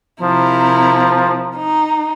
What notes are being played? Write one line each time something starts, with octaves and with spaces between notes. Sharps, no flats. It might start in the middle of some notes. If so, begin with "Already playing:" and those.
C3 F3 E4 A#4
D#4